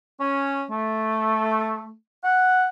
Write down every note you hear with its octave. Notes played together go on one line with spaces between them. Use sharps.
C#4
A3
F#5